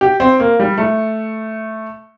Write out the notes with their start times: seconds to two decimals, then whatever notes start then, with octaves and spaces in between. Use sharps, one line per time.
0.01 G4
0.20 C4
0.40 A#3
0.60 G3
0.78 A3